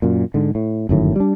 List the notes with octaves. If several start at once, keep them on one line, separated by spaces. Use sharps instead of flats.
F#2 A#2
G#2 D3
A2
G1 F#2 A2 D#3
G3 D4